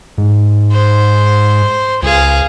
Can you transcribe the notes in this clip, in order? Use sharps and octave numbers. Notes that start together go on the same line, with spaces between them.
G#2
C5
C#2 G#4 F5